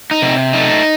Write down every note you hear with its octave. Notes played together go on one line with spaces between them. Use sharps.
D#4
C3
A3 D#4